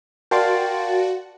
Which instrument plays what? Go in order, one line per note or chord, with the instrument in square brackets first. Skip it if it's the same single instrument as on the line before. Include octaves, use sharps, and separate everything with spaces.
[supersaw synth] F#4 [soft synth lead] A#4 [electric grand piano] D5 F5 A5 [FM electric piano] G5 C6 A6